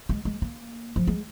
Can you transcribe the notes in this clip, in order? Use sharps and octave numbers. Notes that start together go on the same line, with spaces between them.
G#3
G#3
A#3
F3
G#3